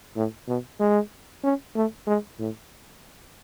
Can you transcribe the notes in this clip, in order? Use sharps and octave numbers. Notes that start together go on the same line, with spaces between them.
A2
B2
G#3
C#4
A3
G#3
A2